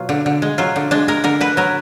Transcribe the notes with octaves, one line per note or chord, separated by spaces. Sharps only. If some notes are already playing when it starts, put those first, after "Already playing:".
Already playing: B2 F#3 F4
D3
D3
G#3
F#3 F4
D3
G#3 D4
G#3 A#4
D3 A#4
D3 B4
F#3 A#4